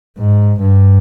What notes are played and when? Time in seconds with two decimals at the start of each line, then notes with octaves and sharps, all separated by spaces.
0.18 G#2
0.59 G2